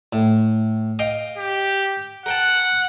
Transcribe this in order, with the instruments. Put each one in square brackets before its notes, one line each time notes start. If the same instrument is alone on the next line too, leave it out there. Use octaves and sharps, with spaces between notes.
[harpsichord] A2
D#5 F5 G5
[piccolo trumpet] G4
[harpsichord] A#4 G5 A5 [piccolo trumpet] F#5